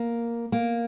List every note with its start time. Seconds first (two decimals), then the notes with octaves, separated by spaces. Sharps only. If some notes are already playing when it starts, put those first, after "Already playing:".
Already playing: A#3
0.52 A#3